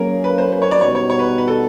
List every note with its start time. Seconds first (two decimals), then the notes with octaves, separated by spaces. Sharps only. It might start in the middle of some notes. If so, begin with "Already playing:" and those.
Already playing: F#3 A#3 C#4 G#4 A#4
0.24 B4
0.38 C5
0.52 C5
0.62 C#5
0.71 D5
0.81 B2 G3 B3 D#4 F#4 C#5
0.95 C#5
1.10 C#5
1.19 B4
1.38 B4
1.48 A4